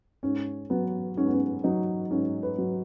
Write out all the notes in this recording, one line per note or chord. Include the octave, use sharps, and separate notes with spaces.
G#2 C#4
F#3 B3
G#2 C#4
B3
C#4
F#3 D#4
G#2 C#4
B4
F#3